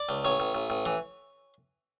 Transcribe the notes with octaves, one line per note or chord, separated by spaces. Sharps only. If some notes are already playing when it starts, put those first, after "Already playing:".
Already playing: D5
C#2
A1 C#5
A1
A1
A1
E3